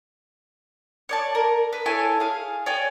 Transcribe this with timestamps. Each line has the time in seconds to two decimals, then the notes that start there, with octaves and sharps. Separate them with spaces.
1.09 C#5 D5 A5
1.35 A#4
1.73 B4
1.86 E4 A4 C#5 G#5
2.20 G#4 F5
2.66 C#5 D5 G5 G#5